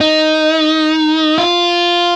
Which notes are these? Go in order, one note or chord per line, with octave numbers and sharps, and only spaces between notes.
D#4
F4